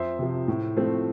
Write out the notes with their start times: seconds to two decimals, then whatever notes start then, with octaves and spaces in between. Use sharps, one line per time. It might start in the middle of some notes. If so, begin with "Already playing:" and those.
Already playing: F2 C5 E5
0.19 C3 F3
0.48 A2
0.77 F3 A3 C4